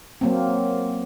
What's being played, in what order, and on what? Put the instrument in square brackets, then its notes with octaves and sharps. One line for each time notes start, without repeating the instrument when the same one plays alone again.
[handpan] F#3 A#3 C4